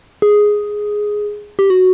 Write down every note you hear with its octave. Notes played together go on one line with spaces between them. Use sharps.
G#4
G4
F#4